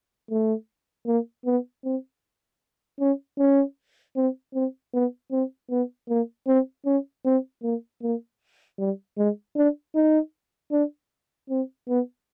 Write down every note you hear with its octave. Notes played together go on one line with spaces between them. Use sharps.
A3
A#3
B3
C4
C#4
C#4
C4
C4
B3
C4
B3
A#3
C4
C#4
C4
A#3
A#3
G3
G#3
D4
D#4
D4
C4
B3